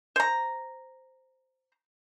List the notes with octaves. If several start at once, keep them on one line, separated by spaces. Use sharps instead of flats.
C5 A#5